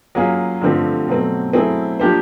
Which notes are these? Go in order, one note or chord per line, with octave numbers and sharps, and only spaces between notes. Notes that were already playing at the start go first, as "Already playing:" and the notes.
F#3 A#3 C#4 F4 G#4
G2 D3 F3 A3 C4
B2 F#3 A3 C4
F#3 A3 C4 E4 G#4
F3 A#3 D4 G4 C5